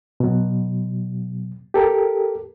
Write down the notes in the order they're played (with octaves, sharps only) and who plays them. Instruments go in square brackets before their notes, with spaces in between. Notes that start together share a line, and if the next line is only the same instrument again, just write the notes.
[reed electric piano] B2 F#3
G4 A4 A#4